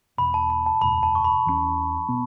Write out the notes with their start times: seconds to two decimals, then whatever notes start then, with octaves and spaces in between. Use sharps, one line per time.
0.18 E1 E2 B2 B5
0.34 A5
0.50 B5
0.66 A5
0.81 F#1 E2 B2 A3 B5
1.03 A5
1.15 C#6
1.25 B5
1.46 E2 E3 A3 C#4
2.09 B2 B3